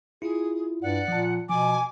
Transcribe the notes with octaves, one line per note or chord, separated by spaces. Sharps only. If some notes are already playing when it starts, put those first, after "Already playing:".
E4 F4 G#4
G2 D5 F#5
A#2 F3 A5
B2 F3 G#5 D6